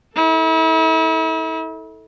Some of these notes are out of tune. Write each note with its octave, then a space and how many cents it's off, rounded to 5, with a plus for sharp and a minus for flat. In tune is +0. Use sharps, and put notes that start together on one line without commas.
E4 -40 A4 +0